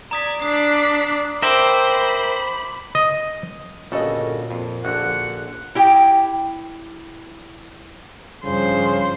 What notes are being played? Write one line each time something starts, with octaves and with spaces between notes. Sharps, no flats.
D5 A#5 D#6 G#6 B6
D4 D#6 B6 C7
A#4 C5 E5 G5 B5 C6 D6 F#7
D#5
G1 A#2 C#3 F#4 A4 A#4 D#5
F2
A#1 D3 F#4 F#5
E4 G4 G5
G2 C#3 F3 C5